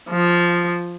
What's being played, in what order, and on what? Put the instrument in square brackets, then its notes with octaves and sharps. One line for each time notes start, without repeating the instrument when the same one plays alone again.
[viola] F3